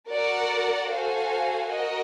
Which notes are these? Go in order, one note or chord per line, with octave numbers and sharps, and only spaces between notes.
F#4 A#4 D5 F#5
F#4 A4 C5 F5 G#5
F#4 A#4 D#5